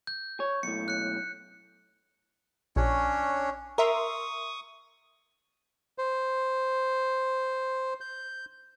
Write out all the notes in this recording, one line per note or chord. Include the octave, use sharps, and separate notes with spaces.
G6
C#5
B1 A2 C#7
F#6 C#7
A#1 C#4 D4 C#5
A#4 E5 C6 C#6 D#6
C5
G6